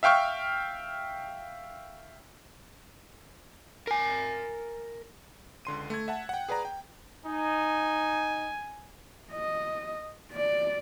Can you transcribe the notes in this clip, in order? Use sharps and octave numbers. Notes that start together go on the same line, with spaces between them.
E5 F5 G5 C#6 F6
A#4 G#5
C#2 D3 C6 D#7
A3 G#6
E5 F#5 A5
F#5 G5
G#4 B4 D5 A#5
G5
D#4 G#5
D#5
D5